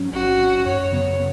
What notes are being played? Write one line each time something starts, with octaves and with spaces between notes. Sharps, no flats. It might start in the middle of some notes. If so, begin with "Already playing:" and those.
Already playing: G#2 F#3 C#4
A1 F#4
G#2 F#3 C#4
F#2 C#5
C#3 F#3 B3